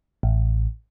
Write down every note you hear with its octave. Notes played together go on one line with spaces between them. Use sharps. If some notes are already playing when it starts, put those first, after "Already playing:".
A1